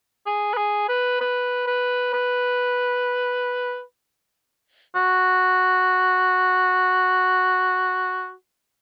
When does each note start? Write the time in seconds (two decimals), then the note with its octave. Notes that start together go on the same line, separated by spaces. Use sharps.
0.26 G#4
0.53 B4
0.57 G#4
0.89 B4
1.21 B4
1.67 B4
2.13 B4
4.95 F#4